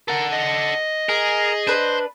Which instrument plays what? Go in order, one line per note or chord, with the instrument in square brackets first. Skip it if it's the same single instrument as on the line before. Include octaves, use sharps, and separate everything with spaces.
[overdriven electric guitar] A4 F#5 [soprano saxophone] A#4
[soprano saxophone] D#5
[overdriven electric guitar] G#4 [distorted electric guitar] A#4
[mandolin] D4 B4 [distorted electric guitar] C5